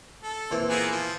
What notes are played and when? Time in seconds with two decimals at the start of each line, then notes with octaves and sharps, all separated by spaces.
0.23 A4
0.51 A#2 E3 C4
0.70 A#3 B3 G#4
0.92 F3